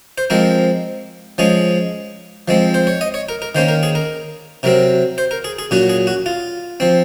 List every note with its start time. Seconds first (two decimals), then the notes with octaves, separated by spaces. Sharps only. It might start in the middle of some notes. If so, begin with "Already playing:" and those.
0.18 C5
0.30 F3 G#3 C4 A#4
1.38 F3 G#3 C#4 G#4
2.48 F3 G#3 C4
2.74 C5
2.87 C#5
3.01 D#5
3.14 C#5
3.29 A#4
3.42 A#4
3.55 D#3 A#3 C#4 C5
3.68 A#4
3.83 G#4
3.95 A#4
4.63 C3 F#3 C4 A#4
5.18 C5
5.31 A#4
5.44 G#4
5.59 G#4
5.71 A#2 F#3 C#4 F#4
5.89 G#4
6.07 F#4
6.26 F4
6.80 F3 C4